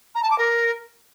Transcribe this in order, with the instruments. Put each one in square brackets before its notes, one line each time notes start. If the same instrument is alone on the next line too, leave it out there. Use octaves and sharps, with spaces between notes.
[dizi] A#5
A5
D6
A#4